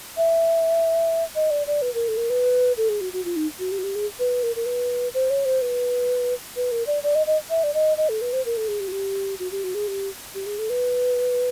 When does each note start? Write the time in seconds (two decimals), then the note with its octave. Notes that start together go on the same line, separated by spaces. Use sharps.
0.17 E5
1.35 D#5
1.51 D5
1.67 D5
1.82 B4
1.94 A#4
2.08 A4
2.17 A#4
2.30 B4
2.77 A4
2.89 G#4
3.01 F#4
3.13 F#4
3.25 F4
3.36 D#4
3.59 F#4
3.72 G4
3.79 F#4
3.84 G4
3.95 G#4
4.19 B4
4.43 A#4
4.56 A#4
4.66 B4
5.14 C5
5.30 C#5
5.45 C5
5.62 B4
6.56 B4
6.72 A#4
6.87 D5
7.03 D5
7.15 D#5
7.27 D#5
7.50 E5
7.64 D5
7.74 D#5
7.97 D#5
8.09 A4
8.21 B4
8.33 C5
8.45 A#4
8.57 A4
8.68 G#4
8.80 G4
8.88 F#4
8.92 G4
9.40 F#4
9.52 G4
9.64 F#4
9.75 G#4
9.88 G4
10.35 G4
10.46 G#4
10.59 A4
10.70 B4